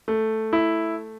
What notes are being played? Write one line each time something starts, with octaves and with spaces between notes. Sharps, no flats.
A3
E4